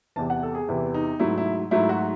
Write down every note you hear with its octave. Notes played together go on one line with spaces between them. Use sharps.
E2 C3 E3 A5
F#5
A4
G#4
E2 C3 E3 E4
D#4
G#2 F#3 A3 E4
E4
G#2 F#3 A3 E4
F#4